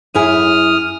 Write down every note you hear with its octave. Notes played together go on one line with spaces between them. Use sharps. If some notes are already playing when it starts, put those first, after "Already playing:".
F#2 E4 G#4 D#6 F6